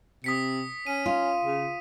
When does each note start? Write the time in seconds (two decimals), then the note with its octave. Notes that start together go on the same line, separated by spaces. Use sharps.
0.24 C3 D#6 B6 C#7
0.87 C#4 D#7
1.06 F4
1.44 C#3